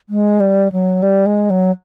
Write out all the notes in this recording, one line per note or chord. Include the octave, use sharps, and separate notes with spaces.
G#3
G3
F#3
G3
G#3
F#3